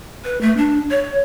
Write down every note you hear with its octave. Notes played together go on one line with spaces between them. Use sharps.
B4
A3
D4
C#5